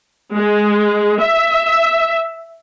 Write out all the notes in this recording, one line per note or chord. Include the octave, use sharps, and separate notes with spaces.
G#3
E5